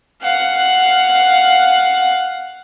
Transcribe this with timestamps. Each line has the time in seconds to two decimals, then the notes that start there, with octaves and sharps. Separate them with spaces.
0.22 F5 F#5